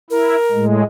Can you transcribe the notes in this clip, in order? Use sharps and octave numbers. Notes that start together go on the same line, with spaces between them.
E4 A#4
A2 G#3